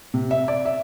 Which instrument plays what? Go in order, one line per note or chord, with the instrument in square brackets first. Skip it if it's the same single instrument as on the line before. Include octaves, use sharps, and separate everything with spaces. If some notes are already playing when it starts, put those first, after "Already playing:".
[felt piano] C3
E5
D5
E5